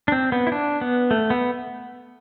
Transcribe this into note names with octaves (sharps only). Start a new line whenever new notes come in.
D4
C4
B3
E4
D4
B3
A3
B3